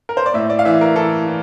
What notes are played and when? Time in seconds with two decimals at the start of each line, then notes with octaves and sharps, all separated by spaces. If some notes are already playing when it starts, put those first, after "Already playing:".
0.09 A#4
0.17 C5
0.26 D5
0.34 A2 E5
0.50 D5
0.59 F5
0.65 E3 E5
0.81 A#4
0.96 E3 A4
1.27 E3